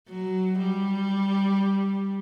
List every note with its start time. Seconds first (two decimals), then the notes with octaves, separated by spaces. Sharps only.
0.08 F#3
0.59 G3